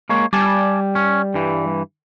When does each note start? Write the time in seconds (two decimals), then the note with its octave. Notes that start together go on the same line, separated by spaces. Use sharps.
0.09 G#3 A#3 C#5
0.33 G3 D5 G#5 A5
0.95 C#4
1.34 G2 E3